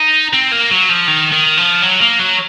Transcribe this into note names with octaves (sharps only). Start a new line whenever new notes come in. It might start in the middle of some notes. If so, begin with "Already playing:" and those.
Already playing: D#4
C4
A#3
F#3
F3
D#3
D#3
F3
F#3
A#3
F#3